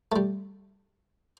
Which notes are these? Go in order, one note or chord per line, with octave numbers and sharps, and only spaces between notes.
G3 A3